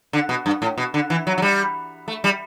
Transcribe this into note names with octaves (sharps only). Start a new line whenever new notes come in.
D3
B2
G2
A2
B2
D3
E3
F#3
F#3
G3
A3
G3